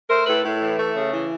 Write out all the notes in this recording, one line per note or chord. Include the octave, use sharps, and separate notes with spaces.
A3 A#4 C5
A2 A4 B4
A2
E3
A3
C#3
E3